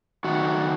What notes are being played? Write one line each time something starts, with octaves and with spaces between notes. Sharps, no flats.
D#3 F#3 A3 F#4